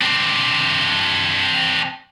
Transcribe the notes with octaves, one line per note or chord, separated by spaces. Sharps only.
C4 D4